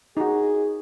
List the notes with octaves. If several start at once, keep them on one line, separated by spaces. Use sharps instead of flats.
D#4 F#4 G#4